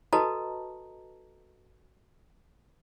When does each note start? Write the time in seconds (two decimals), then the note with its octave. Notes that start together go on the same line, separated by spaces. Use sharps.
0.13 F#4 A4 B4 D#5 A5 A#5